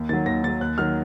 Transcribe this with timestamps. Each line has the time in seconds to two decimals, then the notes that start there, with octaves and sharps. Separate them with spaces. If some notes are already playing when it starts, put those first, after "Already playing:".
Already playing: D#2
0.09 D#3 F#3 A6
0.26 D#2 A#6
0.43 D#3 A6
0.48 F#3
0.61 D#2 F#6
0.78 D#3 F#3 F6